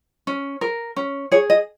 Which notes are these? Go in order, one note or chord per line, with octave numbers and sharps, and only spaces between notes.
C#4
A#4
C#4
G#4 C#5
D#5